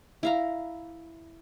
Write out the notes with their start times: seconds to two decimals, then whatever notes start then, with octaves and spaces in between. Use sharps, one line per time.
0.23 E4 F5 A#5